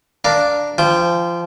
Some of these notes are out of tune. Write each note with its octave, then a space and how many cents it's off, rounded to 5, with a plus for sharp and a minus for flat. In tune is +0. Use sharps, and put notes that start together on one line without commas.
D4 +0 A#4 +0 F5 +0
F3 -25 G5 +0